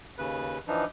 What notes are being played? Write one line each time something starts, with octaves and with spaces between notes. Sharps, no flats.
D#2 C#3 B4
E3 F3 D4 D#4